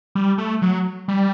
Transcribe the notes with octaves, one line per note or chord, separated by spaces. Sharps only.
G3
A3
F#3
G3